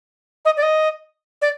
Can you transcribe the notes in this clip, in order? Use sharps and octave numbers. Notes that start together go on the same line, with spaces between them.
D#5
D5
D#5
D5